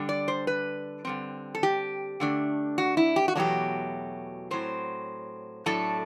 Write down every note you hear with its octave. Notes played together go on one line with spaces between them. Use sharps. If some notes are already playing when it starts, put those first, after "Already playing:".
Already playing: D3 G3 D4
D5
C5
B4
D3 G3 C4
A4
G4
D3 A3 D4
F#4
E4
G4
F#4
E2 B2 F#3 A3 D4 G4
A2 F#3 C4 C5
A2 F#3 A3 D4 A4